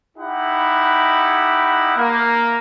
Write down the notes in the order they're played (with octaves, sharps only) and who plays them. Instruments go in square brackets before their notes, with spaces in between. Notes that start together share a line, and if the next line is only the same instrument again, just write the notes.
[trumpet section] D#4 E4 G4 F#5
A#3